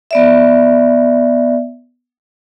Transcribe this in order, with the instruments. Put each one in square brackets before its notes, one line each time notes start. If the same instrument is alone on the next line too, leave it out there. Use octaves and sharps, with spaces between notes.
[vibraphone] B3 D5 E5